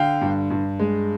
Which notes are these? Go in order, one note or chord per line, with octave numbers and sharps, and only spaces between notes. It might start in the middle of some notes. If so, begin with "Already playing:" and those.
Already playing: D3 F5 G5
G2
G2
G#3